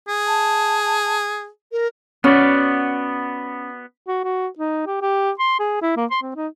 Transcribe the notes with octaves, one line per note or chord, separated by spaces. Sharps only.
G#4
A5
A#4
B3 C#4 F#4 D5
F#4
F#4
D#4
G4
G4
C6
G#4
E4
A#3
C6
C4
D#4